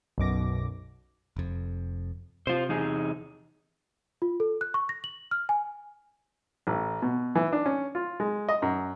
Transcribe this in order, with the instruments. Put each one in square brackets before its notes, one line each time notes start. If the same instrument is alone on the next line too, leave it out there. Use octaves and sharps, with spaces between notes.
[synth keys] B1 F#2 B2 D6 A#6
[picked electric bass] F1 F2
[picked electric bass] C3 [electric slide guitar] F4 C5
[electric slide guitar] E2 D#4 G#4
[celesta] F4
A4
F#6
C#6
A#6
F#7
F6
G#5
[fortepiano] A1
B2
E3
D4
C#4
F4
G#3
D#5
F#2